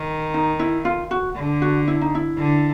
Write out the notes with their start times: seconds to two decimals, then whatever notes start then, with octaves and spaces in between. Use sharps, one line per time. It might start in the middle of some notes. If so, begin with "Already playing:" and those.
Already playing: D#3
0.34 D#4
0.59 E4
0.85 F4
1.11 F#4
1.36 D3
1.62 F#4
1.88 E4
2.01 D#4
2.15 E4
2.38 D3